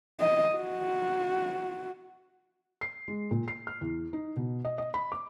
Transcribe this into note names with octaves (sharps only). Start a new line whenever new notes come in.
D#5
F#4
C7
G#3
A#2
C7
F6
E2
D#4
B2
D#5
D#5
B5
D6